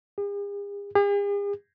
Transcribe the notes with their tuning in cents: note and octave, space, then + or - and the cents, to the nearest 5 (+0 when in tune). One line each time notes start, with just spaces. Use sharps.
G#4 -45
G#4 -45